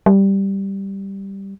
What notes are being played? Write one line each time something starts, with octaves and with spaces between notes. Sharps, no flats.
G3